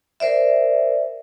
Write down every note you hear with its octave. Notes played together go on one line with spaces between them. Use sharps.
A#4 C5 D5 E5